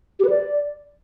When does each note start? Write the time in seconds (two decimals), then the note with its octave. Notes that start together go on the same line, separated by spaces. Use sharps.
0.20 G4
0.25 B4
0.30 D5